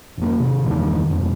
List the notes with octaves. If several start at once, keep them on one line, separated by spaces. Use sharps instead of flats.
F1 A#3
C3 D#3
E2 G2 D#3
D#1 F2